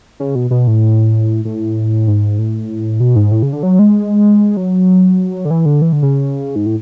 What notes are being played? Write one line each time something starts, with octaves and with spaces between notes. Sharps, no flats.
C#3
B2
B2
A2
A2
G#2
A2
B2
G#2
A2
C#3
D3
F#3
G#3
F#3
D3
E3
D3
E3
D3
C#3
G#2
A2